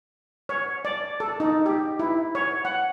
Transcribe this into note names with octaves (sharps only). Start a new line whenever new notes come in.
C#5
D5
A4
D#4
G4
E4
C#5
F#5